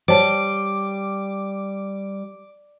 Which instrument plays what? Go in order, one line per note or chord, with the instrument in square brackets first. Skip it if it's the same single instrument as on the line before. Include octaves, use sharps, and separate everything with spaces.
[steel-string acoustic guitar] G3 [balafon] C5 C#5 A5 [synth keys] D6